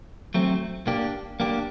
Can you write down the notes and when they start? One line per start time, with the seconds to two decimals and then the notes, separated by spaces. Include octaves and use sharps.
0.34 F#3 A3 C4
0.87 A#3 D4 G4
1.40 A#3 D4 G4